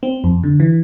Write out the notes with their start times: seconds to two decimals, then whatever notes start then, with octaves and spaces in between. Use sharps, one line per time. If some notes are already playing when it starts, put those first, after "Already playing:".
0.03 C4
0.24 F2
0.44 D3
0.60 E3